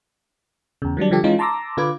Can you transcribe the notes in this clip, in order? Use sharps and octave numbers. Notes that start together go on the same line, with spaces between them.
E2 C#3
D#3 F#3 G3 D4
D3 F3 G3 G4 A4
E3 G#3 C#4 D#4 F4
A5 A#5 C6 D6 E6 A#6
D3 F4 B4 D6 G#6